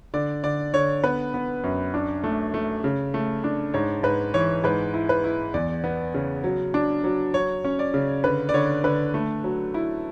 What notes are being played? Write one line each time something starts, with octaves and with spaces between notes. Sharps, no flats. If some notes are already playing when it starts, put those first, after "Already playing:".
D3 D5
D3 D5
D3 C#5
B3 B4
B3
F#2
D4
A3
A3
C#3
A3
D4
G#2 C#5
G#2 B4
E3 C#5
G#2 B4
E4
B4
E4
E2 D5
B3
C#3
F#3
D4
F#3
F#3 C#5
C#4
D5
C#3
D3 B4
D5
D3 C#5
D3 B4
A3
F#3
E4